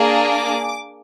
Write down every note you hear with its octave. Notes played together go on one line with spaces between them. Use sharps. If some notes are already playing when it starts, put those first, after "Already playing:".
Already playing: A#3 D4 G#4
D6